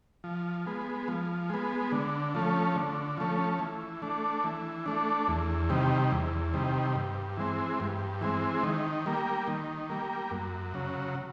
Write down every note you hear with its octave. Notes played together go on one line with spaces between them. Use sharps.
F3
G#3 B3
F3
G#3 B3
D3
F3 A3 C#4
D3
F3 A3 C#4
E3
A3 D4
E3
A3 D4
E2
C3 D#3 G3
E2
C3 D#3 G3
G2
E3 G#3 C4
G2
E3 G#3 C4
D#3
G3 A#3
D#3
G3 A#3
F#2
C#3 F#3